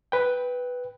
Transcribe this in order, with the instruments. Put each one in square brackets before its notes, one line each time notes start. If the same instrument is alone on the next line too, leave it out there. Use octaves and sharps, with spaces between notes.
[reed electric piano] B4 G5